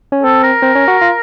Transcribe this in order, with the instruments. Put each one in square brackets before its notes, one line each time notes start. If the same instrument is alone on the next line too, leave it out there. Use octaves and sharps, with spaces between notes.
[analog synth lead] C#4
[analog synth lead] C4 [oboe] A4
[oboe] A#4
[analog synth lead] C4
C#4
F#4
F4